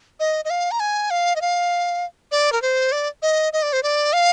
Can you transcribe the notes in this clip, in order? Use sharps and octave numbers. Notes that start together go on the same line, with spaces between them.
D#5
D#5
F5
A#5
G#5
F5
D#5
F5
D5
A#4
C5
D5
D#5
D#5
D5
C5
D5
F5